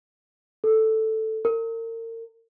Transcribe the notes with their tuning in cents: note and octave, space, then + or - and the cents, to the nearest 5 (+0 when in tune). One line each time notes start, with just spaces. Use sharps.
A4 +0
A#4 -40